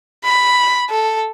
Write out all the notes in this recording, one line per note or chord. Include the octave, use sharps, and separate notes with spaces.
B5
A4